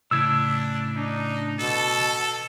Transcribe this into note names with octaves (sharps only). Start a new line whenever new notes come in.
A2 C#3 D4 E4 E6 G#6
D4 D#4
B2 A4